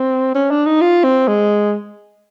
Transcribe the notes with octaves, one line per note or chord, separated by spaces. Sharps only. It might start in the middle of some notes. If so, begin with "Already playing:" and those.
Already playing: C4
C#4
D4
D#4
F4
C4
G#3